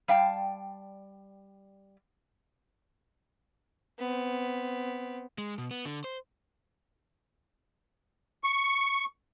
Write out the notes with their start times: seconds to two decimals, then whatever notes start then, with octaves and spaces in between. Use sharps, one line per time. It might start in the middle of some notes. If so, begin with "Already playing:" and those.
0.08 G3 F5 G5 A5
3.99 B3 C4
5.38 G#3
5.58 B2
5.71 B3
5.85 D3
6.04 C5
8.44 C#6